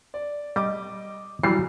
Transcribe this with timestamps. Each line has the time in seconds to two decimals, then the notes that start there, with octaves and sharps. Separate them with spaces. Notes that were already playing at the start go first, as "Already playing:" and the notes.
0.14 D5
0.56 G3 D#5 D6
1.43 E3 F#3 G3 C7